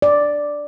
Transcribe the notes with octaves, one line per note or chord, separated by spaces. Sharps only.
D5